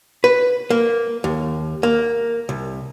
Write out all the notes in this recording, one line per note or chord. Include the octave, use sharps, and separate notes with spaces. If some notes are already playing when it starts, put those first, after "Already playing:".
B4
A#3
D#2
A#3
C2